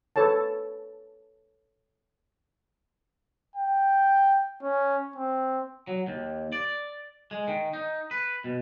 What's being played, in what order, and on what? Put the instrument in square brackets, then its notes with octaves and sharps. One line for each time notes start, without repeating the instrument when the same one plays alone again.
[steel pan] A4 B4 C#5 A5
[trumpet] G5
C#4
C4
[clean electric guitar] F#3
D#2
D5
G#3
D#3
D#4
B4
B2